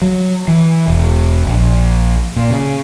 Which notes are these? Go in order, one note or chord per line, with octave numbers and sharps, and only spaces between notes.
F#3
E3
E1
A#1
A#2
C#3